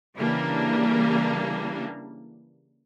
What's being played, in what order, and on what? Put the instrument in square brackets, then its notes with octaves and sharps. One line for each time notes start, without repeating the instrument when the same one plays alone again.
[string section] C#3 E3 G3 A#3 D4